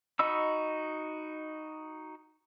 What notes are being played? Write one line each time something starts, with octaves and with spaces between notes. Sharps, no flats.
D#4 F#4 D#5 B5 E6